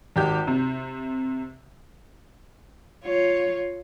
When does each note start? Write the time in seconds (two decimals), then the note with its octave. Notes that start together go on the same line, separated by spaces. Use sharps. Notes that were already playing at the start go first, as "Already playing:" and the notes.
0.16 G#1 G4 G6
0.47 C3
3.04 F4 C#5